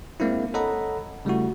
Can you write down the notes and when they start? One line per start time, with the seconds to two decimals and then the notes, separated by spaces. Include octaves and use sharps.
0.20 G#3 A#3 C4 D4 E4
0.54 A4 C#5 D#5 F#5 A#5 B5
1.25 C#3 G3 A3 E4 F#4